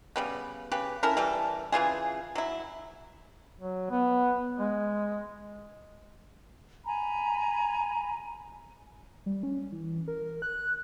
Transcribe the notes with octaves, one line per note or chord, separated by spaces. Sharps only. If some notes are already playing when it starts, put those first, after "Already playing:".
C#3 G3 B3
C#3 G4 B4
C#4 E4 A4 A#4
E3 G3 A4
C#3 E3 F4 G#4
F#3 E4
F#3
B3
G#3
G#5 A#5 B5
G3
C#4
E3
A#4
F#6